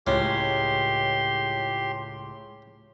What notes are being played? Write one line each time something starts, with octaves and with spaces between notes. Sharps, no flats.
C#2 A2 C#4 G4 C6